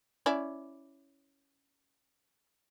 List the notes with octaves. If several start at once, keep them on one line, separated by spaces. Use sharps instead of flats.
C#4 E4 D5